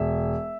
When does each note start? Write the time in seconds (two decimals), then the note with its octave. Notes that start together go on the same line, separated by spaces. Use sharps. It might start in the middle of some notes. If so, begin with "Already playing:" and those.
Already playing: E1 E5